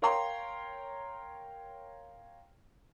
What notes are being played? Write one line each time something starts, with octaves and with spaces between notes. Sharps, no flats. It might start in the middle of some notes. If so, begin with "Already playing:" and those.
A#4 C#5 F5 G5 A#5 C6